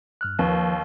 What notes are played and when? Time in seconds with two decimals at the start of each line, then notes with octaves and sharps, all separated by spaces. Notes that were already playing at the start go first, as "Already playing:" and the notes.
0.21 G2 F6 F#6
0.39 D#2 F3 B4